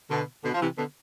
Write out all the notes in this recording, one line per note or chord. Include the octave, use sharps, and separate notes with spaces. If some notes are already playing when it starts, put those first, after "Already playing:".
B2 D3
B2 D3
F3
C3 E3
B2 D3